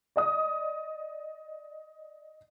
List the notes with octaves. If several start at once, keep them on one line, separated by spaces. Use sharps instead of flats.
D5 D#5 D#6